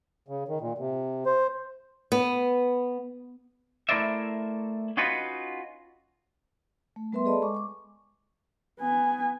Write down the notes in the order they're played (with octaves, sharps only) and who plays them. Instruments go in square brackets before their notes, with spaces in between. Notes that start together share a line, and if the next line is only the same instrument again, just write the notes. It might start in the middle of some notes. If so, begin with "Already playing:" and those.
[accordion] C#3
D#3
A#2
C3
C5
[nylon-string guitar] B3
[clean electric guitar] A3 E4 A#4 C5 D5 E5
C#4 D#4 F4 F#4 B4
[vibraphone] A3
G3 B3 A#4 B4 E5 C6
G#4 A4 D5 D#5 A5 B5
G#3 C#6 D6
C#6 D6
[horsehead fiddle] B3 G#5